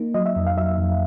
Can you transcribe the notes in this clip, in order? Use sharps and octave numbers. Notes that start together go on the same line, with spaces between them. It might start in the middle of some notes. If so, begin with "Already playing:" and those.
Already playing: A#3 D#4
F#3 D#5
E5
F2
F5
F#3 E5
F2